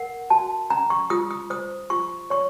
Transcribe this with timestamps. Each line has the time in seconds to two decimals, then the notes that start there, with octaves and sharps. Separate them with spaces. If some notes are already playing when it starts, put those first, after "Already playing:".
Already playing: A#4 F#5
0.30 F#4 A5
0.70 C#4 A#5
0.90 C#6
1.10 F4 D#6
1.31 D#6
1.50 C5 D#6
1.90 F4 C#6
2.30 C#5 C#6